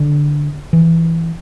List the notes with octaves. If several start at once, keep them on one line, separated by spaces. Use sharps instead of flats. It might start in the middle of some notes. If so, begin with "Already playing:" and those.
Already playing: D3
E3